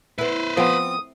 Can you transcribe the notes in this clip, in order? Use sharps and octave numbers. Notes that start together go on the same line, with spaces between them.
B3 E4 B4 C5
F3 B3 C4 D#6